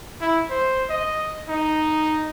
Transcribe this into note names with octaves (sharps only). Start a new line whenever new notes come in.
E4
C5
D#5
D#4